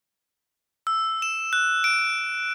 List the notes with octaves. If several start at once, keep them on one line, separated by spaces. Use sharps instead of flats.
E6
E7
F#6
D7